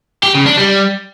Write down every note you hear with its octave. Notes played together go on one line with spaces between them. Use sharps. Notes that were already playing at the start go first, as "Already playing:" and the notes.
G4
C#3
D4
G3